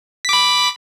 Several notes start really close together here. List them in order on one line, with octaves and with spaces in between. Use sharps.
B6 D6 B5